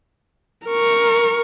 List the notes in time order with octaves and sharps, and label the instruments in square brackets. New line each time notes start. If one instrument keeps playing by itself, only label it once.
[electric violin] A#4 C#6